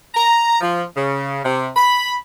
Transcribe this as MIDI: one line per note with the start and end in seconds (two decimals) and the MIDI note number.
0.14 0.57 82
0.61 0.83 53
0.96 1.40 49
1.44 1.69 48
1.76 2.15 83